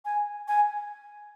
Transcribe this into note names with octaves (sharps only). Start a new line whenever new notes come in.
G#5
G#5